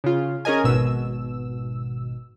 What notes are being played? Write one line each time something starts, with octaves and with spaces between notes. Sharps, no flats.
C#3 F4
C#4 G#4 A#4 D#5 G#5
G#1 B2 E6